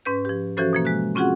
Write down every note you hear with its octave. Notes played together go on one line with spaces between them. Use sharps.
G#2 C#4 B4 G6
F3 G4
E3 F3 C#4 F#4 A4 C5
B2 F3 A#3
G#3 F#6
C4 C#4 F4 F#4 G#4 F#5